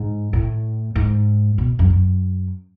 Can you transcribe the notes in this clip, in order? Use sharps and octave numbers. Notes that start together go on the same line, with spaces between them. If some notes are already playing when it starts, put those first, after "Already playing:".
Already playing: G#2
A2
G#2
B2
F#2
F#2